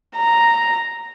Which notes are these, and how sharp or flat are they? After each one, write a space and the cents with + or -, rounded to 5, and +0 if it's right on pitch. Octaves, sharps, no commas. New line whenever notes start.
A#5 -5